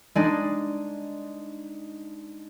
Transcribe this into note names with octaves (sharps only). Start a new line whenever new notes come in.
G#3 D4 D#4